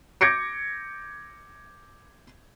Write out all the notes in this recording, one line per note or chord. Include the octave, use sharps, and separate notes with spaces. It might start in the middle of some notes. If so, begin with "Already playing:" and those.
D6 G6 G#6 A#6 C#7 D7